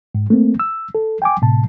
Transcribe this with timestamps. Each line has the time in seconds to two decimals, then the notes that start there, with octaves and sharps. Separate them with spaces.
0.15 G#2
0.30 A3 A#3 C4
0.60 E6
0.95 A4
1.22 G5 G#5 D6
1.42 A2 C3 A5